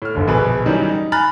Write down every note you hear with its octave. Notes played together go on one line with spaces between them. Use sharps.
A2 F6
G1 D#2 D3
A#1 B2 G#4 B4
D#3 E3 F#3 G3 C#4 D#4
D#4
G#5 A#5 B5 F6 F#6 A6